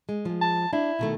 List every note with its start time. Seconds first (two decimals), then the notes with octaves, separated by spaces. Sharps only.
0.09 G#3
0.25 F3 G#3
0.41 A5
0.73 D4 E4
0.99 B2 D#3 A3